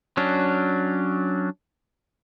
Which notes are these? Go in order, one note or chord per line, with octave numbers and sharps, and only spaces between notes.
F#3 C#4 D4